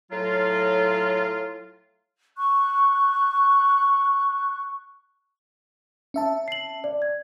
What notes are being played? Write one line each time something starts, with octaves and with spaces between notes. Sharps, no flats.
A2 F#3 F4
C#6 F#6
C#4 E5 A5
C7 F#7
D5
G#6